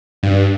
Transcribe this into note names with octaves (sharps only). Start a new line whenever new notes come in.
G2